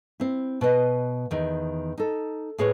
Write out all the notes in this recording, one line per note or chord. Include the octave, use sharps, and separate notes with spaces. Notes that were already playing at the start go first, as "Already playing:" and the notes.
C4 E4
B2 B4 D#5
E2 D#3
D#4 A4
A2 G#4 B4 C#5